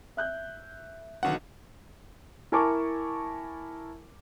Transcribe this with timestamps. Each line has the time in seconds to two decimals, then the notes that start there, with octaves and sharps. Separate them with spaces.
0.17 E5 F#6 G6
1.23 B1 B2 D3 D#3 F#5
2.52 E4 A#4 G#5 A5 C#6 D6